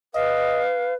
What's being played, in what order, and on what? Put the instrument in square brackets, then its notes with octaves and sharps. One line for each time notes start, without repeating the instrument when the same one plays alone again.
[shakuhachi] B4 [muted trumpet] D#5 [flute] F5